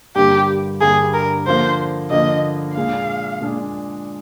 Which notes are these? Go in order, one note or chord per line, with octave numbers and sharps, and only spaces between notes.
G2 D3 G3 A#3 G4
G2 D3 G3 A#3 G#4
A#4
D3 F3 A#3 C5
D3 F3 A#3 D#5
A#2 G#3 D4 G#4 F5
A#2 G#3 D4 G#4